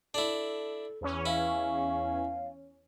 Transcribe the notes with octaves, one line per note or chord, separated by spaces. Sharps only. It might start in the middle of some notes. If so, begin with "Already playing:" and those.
D4 E4 A4
E2 E3 C#4
E4 F5